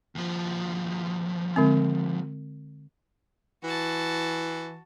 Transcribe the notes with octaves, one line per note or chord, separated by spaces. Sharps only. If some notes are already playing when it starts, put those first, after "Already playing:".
D#2 F3
D3 G#3 C4
E3 F#4 A5